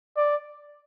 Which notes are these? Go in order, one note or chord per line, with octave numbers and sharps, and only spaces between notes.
D5